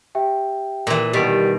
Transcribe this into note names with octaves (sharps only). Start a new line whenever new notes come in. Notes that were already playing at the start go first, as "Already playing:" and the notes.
G4 E5 G5
A#2 E3
B2 D#3 G3 B3 A6 B6 D7